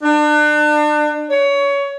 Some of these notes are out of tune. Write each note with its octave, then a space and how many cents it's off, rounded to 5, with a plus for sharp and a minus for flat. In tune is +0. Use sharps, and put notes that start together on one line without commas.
D4 +35
C#5 +20